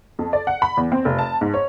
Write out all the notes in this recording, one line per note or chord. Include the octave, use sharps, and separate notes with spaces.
F2
D5
F#5
B5
E2
C4
F1
A5
G#2
C#5